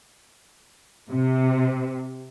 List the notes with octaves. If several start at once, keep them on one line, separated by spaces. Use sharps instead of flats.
C3